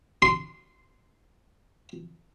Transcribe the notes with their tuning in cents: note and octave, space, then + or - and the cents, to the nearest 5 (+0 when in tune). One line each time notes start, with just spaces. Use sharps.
C6 -15